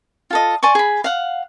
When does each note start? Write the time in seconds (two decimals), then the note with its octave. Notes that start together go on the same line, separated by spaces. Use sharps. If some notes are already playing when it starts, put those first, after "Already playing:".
0.30 F4 A4 D#5
0.63 D5 G#5 C6 C#6
0.75 G#4 B5
1.04 F5 F#5